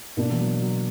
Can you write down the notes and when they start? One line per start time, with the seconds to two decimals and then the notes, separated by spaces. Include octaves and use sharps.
0.17 B2 A#3 D4
0.32 E3
0.40 F#3
0.62 F#3